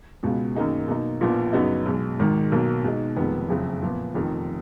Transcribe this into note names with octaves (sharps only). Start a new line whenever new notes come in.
C#2 B2 G#3 B3 F4
F#2 D#3 A#3 D#4 G#4
B2 A#3 D#4
A#1 A#2 F3 B3
F#2 C#3 F#3 B3 D#4
B1 B2 G#3
G#1 G#2 D#3 G#3
B1 B2 F#3 A#3
B2 G#3 D#4
F1 F2 D#3 G#3 B3
F#1 F2 C#3 F3
A#2 F3 B3
F1 F2 D#3